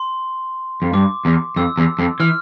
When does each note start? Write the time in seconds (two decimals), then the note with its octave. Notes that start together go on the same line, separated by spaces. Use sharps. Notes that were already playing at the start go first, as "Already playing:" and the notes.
Already playing: C6
0.82 F2
0.93 G2 D6
1.25 E2
1.56 F2 E6
1.77 E2
1.99 F2
2.20 E3 F6